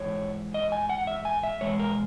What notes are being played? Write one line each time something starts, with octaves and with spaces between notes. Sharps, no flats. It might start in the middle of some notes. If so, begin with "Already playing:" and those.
Already playing: G#2 E3 C#5
D#5
G#5
F#5
E5
G#5
E5
E2 B2 G#3 C#5
A#4